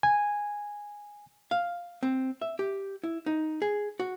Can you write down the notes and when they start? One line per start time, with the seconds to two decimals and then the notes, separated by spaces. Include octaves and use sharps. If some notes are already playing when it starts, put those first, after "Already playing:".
0.03 G#5
1.51 F5
2.03 C4
2.41 E5
2.59 G4
3.04 E4
3.26 D#4
3.62 G#4
4.00 F#4